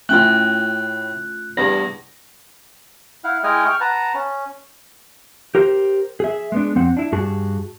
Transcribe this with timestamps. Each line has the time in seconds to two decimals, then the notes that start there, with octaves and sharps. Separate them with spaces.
0.09 A2 A3 C#4 F4 G5 F#6
1.57 E2 G2 A#6
3.24 E4 F5 F#5
3.44 G#3 E4 D#5 G5 G#5 F6
3.65 G5 C#6 F6
3.81 B4 F#5 A5 A#5
4.14 C#4
5.55 G4 A#4 C5
6.20 G#4 E5
6.52 G#3 B3 D4
6.75 F2 C4 F#5
6.97 D4 E4
7.12 G2 F#4 G#4 A5